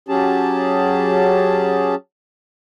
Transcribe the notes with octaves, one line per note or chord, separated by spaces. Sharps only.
F#3 C#4 G4 G#4 A5